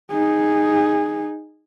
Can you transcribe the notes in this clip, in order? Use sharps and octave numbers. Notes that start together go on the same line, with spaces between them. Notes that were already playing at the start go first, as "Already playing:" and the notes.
D#4 G#4